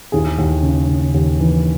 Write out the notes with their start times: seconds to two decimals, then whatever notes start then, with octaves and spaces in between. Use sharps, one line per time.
0.12 D#2 E4 G#4
0.38 D#2
0.63 C#3
0.88 C#3
1.14 D#2
1.39 E3